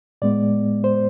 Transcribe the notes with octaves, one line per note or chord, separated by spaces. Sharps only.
A2 G#3 B3 D5
C5